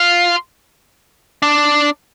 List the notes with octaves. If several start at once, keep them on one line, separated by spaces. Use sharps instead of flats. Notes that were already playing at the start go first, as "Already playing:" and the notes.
Already playing: F4
D4